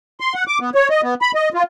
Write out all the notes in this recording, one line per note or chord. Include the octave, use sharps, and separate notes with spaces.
C6
F#5
D6
B3
C#5
D#5
B3
B5
D#5
F4